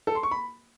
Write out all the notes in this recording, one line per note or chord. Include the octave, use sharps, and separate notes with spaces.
A4
C6
C#6
B5